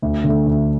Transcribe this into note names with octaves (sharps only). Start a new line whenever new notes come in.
D2
D3 A3
D2